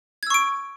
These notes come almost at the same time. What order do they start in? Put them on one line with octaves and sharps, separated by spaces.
G#6 E6 C#6 D7